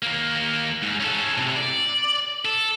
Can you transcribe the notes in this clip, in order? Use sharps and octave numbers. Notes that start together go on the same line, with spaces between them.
D#2 A#3
G#2
C#4 A4
A2 C3
D5
A4